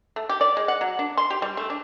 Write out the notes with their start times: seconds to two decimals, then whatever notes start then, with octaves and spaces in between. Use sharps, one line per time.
0.16 A3
0.29 G4
0.41 D5
0.57 G#3
0.68 F#5
0.81 F#3
0.99 D4
1.17 C6
1.30 G4
1.42 G3
1.57 A3
1.70 D4